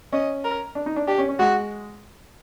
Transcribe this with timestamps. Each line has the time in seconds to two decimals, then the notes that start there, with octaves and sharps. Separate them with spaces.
0.13 C#4 D#5
0.44 A#4
0.75 D4
0.86 D#4
0.96 D4
1.07 D4 G4
1.18 C#4
1.29 C#4
1.39 G#3 F#4